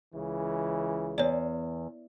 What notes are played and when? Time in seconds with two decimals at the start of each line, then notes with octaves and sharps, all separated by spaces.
0.14 C#2 C#3 E3
1.18 E2 C#5 D5